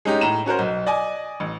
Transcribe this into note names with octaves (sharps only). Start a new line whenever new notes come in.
G#3 C#4 D#4 G4
A2 A#5 E7
C#4 F#4 A#4 C5
B1
D5 D#5 G#5
A1